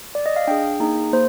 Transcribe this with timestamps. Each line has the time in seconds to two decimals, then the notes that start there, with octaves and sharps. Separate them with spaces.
0.15 D5
0.26 D#5
0.36 F5
0.47 D4 G#4 G5
0.80 A#3 D#4 G#4
1.13 A#3 C5